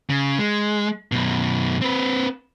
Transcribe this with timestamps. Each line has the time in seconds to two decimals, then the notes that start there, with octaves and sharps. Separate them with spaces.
0.10 C#3
0.39 G#3
1.12 F#2 B2
1.82 C4 B4